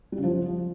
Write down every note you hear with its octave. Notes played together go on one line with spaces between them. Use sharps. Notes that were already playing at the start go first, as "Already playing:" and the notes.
G3
C#3
F3